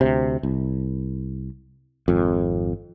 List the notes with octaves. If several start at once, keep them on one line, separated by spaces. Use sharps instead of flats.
D2 C3
C2
G#1 F2